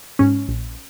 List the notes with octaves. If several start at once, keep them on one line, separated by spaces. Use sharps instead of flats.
G#2 C#4
A#1